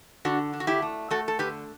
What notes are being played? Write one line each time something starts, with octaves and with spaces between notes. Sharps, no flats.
D3 D4 F#4
D4
F#4
E4 G4
A3
A3 F#4 A4
A4
D3 G4 B4